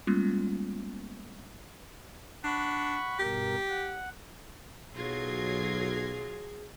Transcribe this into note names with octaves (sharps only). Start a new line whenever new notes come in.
G3 G#3 A#3 B3 C#4 F4
D4 F#5 B5 C#6
G2 B2 G4 A#4
F#5
B1 F#3 F4 G#4 G#6 A#6 C7